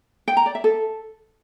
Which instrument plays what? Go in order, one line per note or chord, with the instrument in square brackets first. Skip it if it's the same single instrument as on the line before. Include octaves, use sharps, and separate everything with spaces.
[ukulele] G5
A#5
D5
E5
A4